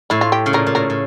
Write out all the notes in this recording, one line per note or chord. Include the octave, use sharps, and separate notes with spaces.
A2 E4
F4
G4
C#3
A#2 A#4
A#2
A2 A#4
A2